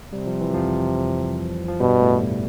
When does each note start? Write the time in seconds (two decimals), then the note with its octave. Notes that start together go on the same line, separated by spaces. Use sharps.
0.13 C3 G3
0.27 F3
0.41 E3
0.54 F2 F3
1.68 F3
1.80 G2 B2 G3
2.01 A2 A3
2.22 B2 B3